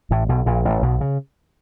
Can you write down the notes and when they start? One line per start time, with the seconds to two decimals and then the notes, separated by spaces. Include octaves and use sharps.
0.11 A1 A2
0.29 B1 B2
0.46 A#1 A#2
0.65 A1 A2
0.82 B1 B2
1.01 C#3